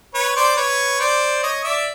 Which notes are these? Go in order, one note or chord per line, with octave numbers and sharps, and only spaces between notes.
B4 C#5
C5 D5
B4 C#5
C5 D5
C#5 D#5
D5 E5